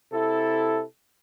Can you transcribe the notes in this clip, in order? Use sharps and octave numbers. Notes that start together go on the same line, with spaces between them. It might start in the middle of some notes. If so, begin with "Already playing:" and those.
C3 E4 A4